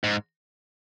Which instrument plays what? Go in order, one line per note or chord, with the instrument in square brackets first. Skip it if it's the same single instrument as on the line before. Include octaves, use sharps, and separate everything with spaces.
[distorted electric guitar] G#2